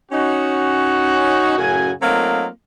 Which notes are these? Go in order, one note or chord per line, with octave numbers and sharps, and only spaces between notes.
C#4 D#4 F#4
F#2 A2 C#3 F#4 G#5
F#3 A3 A#3 C4 D#4 F4